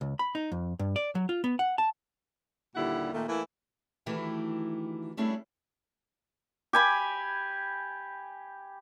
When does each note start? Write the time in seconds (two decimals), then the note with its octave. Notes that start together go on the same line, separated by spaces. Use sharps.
0.01 C#2
0.19 B5
0.35 D#4
0.52 F2
0.79 G2
0.96 D5
1.15 F#3
1.29 F4
1.44 B3
1.59 F#5
1.78 A5
2.76 D#2 A#2 D3 G3 E4 F#5
3.13 A#2 D#3 A3 A#3
3.28 E3 A3 A#3 E4
4.06 D2 D#3 E3 A3 E4 G4
5.17 G3 A3 C#4 D4 E4 G#4
6.73 G4 G#5 B5